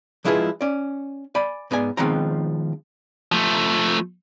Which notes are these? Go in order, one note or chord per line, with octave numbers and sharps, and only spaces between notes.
F3 G#3 E4 F4 G#4 B4
C#4 D5
D5 G#5 B5
G#2 B3 D5 G#5
D#3 F3 G#3 B3 C4 A#5
F3 A3